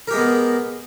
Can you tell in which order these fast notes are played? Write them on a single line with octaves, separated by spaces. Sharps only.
A#4 G4 G#3 B3